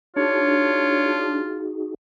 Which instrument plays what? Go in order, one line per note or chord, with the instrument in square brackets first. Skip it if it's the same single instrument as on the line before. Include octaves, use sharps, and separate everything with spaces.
[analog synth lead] D4 [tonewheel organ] D#4 F#4 G#4 [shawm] F4 [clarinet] C#5